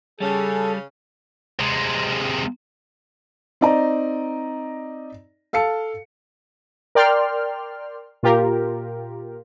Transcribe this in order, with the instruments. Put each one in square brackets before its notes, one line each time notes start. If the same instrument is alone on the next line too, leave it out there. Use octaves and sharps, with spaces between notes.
[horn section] C#3 C#4 [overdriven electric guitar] G3 [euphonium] G#4 [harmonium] A4
[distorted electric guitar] C3 G#3
[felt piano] C4 D#4 D5 D#5 A#5
A4 F5 A5 C#7
[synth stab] A#4 D5 G5 C6 F6
A#2 F4 G4 A#4